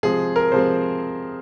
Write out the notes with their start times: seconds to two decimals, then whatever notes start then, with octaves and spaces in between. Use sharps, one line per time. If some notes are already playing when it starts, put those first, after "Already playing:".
0.03 C3 F3 G#3 C4 G#4
0.36 A#4
0.52 C3 F3 G#3 C4 C5